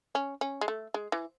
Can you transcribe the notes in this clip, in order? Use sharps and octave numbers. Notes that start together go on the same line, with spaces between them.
C#4
C#4
G#3
A3
G#3
E3